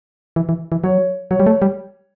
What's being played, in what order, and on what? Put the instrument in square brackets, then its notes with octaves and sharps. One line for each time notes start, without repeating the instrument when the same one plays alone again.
[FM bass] E3
E3
E3
[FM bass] F#3 [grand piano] C#5
[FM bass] F#3 [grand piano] C#5
[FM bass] G3
A3
G3